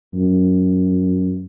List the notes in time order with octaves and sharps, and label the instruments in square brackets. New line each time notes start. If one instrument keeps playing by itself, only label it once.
[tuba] F#2